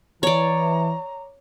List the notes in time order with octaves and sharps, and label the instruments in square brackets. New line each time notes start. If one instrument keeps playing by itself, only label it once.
[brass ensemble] E3 [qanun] C#5 D5 [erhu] A#5